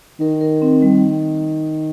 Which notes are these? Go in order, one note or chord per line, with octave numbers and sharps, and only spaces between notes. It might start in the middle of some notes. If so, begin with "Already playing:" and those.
D#3 A#4
A#4
C4
G3